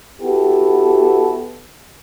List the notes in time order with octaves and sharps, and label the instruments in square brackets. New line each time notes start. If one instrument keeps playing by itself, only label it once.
[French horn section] B3 E4 F#4 G4 A4